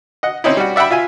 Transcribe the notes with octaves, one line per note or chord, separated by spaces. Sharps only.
D#5 F#5
C4 C#4 D#4 E4
G3 F#4
D5 E5 F#5 G5 B5
F4 E5 G#5